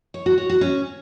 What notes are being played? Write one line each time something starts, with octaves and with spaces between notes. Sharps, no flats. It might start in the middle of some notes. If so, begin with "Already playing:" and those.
C#5
F#4
C#5
F#4
C#4